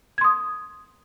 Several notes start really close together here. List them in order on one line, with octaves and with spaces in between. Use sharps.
G#6 C6 D#6